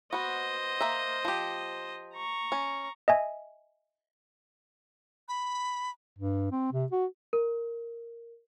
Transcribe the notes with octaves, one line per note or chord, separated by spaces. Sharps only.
B3 F#4 C5 D#5
A#3 A#4 E5
F3 G4
A#5 C#6
C#4
D#5 E5 G#5
B5
G2
C4
C3
F#4
A#4